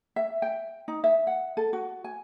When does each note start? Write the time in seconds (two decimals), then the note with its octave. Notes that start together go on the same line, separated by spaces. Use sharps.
0.16 E5
0.42 G5
0.88 D#4
1.04 E5
1.27 F#5
1.57 A4
1.73 F#4
2.04 G#5